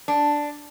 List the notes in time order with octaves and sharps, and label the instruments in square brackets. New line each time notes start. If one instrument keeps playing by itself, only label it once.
[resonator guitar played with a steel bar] D4